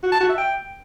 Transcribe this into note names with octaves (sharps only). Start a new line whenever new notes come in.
F#4
A5
F#4
E5
G5